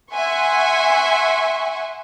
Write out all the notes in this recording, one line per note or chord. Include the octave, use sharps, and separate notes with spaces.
E5 F#5 G#5 C6 C#6